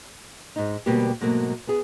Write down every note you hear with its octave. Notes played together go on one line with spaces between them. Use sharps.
G#2 D#4
D2 B2 G3 A#3 G4
G#2 B2 F#3 A3 A#3
B3 G#4